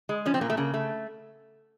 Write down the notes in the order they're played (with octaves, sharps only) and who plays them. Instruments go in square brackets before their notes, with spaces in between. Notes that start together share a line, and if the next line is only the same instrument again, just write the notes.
[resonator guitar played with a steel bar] G#3
F3 C#4
C4
A#2 A#3
A3
C#3 A#3
A3